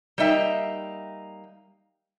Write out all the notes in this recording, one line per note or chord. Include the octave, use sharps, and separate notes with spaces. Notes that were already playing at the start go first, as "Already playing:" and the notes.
G3 A#3 D#4 E5 G5